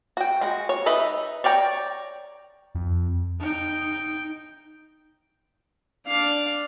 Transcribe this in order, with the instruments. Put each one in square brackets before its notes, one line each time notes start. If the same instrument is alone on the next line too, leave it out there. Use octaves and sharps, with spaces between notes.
[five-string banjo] F#4 G5
G#3 F#4
C#5
D#4 B4 D#5 E5
C#5 D5 G5 A#5
[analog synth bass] F2
[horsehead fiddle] D#4 G5
[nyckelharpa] D4 F5